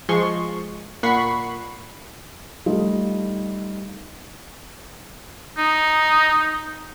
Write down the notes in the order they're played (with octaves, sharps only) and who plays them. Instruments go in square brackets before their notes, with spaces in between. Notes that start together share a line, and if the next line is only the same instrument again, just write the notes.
[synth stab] F3 G#3 C6 C#6
A#2 F#5 B5 C#6 C7
[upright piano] G3 A3 D#4 F4
[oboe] D#4